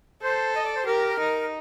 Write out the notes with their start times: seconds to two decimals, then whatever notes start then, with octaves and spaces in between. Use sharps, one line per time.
0.22 A4 C5
0.55 D#5
0.65 D5
0.76 C5
0.86 G4 A#4
1.20 D#4